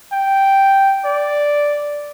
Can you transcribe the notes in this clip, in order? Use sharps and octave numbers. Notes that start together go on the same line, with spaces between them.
G5
D5